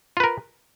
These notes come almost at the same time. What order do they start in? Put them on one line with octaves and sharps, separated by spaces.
F4 B4 A#4